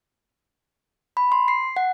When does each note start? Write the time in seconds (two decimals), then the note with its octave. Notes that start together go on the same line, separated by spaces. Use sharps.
1.17 B5
1.32 C6
1.48 C7
1.76 F#5